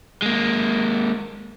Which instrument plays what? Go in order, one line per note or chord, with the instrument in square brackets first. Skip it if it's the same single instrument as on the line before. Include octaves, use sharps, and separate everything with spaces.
[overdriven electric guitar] G#3 A#3